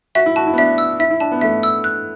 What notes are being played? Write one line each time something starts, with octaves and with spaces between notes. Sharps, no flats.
F#4 E5
E4
F#4 A5
E4
B3
D4 E5
E6
E4 E5
E4
D4 A5
B3
A3 E5
E6
F#6